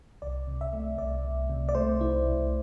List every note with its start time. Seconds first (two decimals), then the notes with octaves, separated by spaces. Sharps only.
0.22 C2 D5
0.47 C3
0.61 E5
0.73 A3
0.98 C2 D5
1.25 C2
1.50 C3
1.69 D5
1.75 A3 C5
2.00 C2 E4
2.25 C2